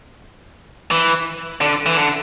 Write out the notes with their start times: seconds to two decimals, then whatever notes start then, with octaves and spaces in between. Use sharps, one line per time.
0.91 E3
1.61 D3
1.86 E3
1.96 D3